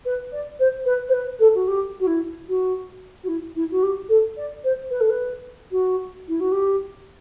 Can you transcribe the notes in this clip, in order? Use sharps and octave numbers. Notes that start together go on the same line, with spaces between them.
B4
D5
C5
B4
C5
B4
A4
F#4
G4
F#4
E4
F#4
F#4
E4
E4
F#4
G4
A4
D5
C5
B4
A4
B4
F#4
E4
F#4
G4